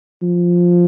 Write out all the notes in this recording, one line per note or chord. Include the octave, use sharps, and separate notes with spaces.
F3